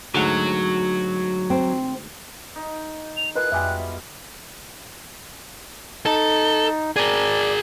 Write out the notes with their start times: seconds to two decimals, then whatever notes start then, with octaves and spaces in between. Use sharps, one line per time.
0.14 D2 G#2 F#3 F#5
1.50 C4
2.56 D#4
3.17 F7
3.36 E4 F4 G#4 A#4 B4 D#5 F#6
3.52 F2 B2 G3 G#3 E5 G#5
6.06 D#4 A4
6.96 G#4 A#4 D5